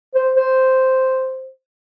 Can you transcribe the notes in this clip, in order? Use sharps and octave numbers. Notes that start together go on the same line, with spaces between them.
C5
C5